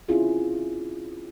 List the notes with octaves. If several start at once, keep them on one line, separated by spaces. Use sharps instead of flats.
C4 C#4 E4 F4 G#4